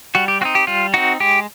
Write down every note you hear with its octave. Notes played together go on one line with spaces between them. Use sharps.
G3 F#4
G4
C4 D#4 F#4
G4
G3 F4
C4 D#4 F#4
G#3 G4